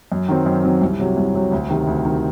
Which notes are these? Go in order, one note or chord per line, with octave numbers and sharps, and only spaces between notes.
F#2
D#3 F#3 C4
F#2
D#3 F#3 C4
C2
C3 F#3
C2
C3 F#3
D2
C3 D#3
D2
C3 D#3